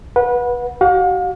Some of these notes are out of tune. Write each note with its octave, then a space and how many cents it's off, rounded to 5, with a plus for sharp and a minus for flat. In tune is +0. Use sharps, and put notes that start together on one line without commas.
B4 -20 F#5 -25
F#4 +45 F5 +40